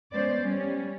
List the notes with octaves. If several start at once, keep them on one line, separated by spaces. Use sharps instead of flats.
G#3 B3 C#4 C5 D5
G3 C#4